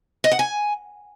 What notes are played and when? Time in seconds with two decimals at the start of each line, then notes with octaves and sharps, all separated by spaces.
0.24 D#5
0.32 F#5
0.39 G#5